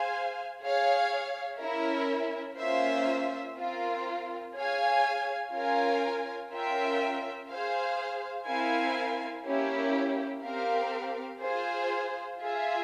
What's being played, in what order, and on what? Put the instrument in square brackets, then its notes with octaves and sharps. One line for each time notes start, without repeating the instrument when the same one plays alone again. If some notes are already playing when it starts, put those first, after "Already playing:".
Already playing: [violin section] G#4 C5 F5 G#5
G#4 C#5 F5
C#4 E4 A#4 E5
A#3 C#4 F4 C5 E5
C4 F4 A#4
G#4 C#5 F5 G#5
C#4 F4 A#4 F5 G#5
C#4 F4 A#4 E5 G5
G#4 C5 F5
C4 E4 A#4 F5 G#5
A#3 C#4 E4 G4
C4 G4 A#4 F5
F4 G#4 C5
F4 G#4 E5